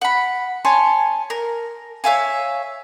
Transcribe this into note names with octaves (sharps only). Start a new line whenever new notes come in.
F#5 B5
C#5 G#5 A5 C6
A#4
C#5 E5 F5 G#5